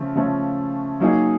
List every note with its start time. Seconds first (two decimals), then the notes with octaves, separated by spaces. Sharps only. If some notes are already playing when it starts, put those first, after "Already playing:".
Already playing: C#3 F3 A3
0.15 C#3 F3 A3 C#4
1.00 F#3 A#3 D#4 G#4